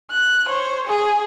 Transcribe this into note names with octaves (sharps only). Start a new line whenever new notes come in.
F#6
C5 C#5
G#4